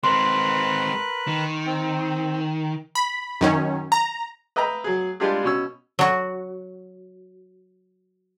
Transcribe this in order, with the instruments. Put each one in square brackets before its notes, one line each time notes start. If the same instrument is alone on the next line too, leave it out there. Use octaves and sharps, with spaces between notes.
[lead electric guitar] G#3 C4 [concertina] A#4 B4 F#6 [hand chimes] C6
[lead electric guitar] D#3
[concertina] C4
[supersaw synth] B5
F#2 D#3 C#4
A#5
[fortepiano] B4 D#5 E5 G5 A#5 B5
F#3 G#4
G3 G#3 D4 F4 G4 G#4
B2 C#4 C#5 E6
[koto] F#3 F#4